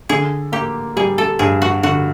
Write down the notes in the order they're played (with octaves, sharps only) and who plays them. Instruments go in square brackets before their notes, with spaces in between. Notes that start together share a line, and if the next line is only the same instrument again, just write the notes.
[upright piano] D3 [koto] G#4
[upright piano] A#3 [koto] G4
[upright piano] G3 [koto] G#4
[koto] A4
[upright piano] G2 [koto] G#4
[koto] F#4
[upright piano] D3 [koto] F#4